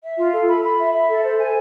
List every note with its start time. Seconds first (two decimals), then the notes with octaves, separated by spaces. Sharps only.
0.03 E5
0.18 F4
0.33 A4
0.48 B5
0.64 B5
0.79 E5
0.95 E5
1.09 A4
1.24 C5
1.40 G#5